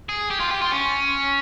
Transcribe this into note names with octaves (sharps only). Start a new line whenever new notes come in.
G#4
G4
F4
G4
F4
C#4